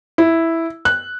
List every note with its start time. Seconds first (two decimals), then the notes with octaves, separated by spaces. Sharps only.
0.18 E4
0.85 F#6